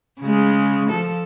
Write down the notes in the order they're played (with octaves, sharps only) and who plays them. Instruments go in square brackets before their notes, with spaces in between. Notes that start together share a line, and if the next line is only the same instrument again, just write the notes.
[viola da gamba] C#3 G#3
F3 A4